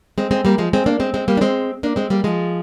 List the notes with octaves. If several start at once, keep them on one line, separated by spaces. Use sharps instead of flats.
G#3 C4
G#3 C4
G3 A#3
F3 G#3
G#3 C4
A#3 D4
G#3 C4
G#3 C4
G3 A#3
D4
G#3 C4
A#3 D4
G#3 C4
G3 A#3
F3 G#3